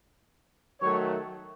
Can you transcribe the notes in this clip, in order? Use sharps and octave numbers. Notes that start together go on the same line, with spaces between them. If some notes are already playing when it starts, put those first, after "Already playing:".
D#3 F#3 A3 C#5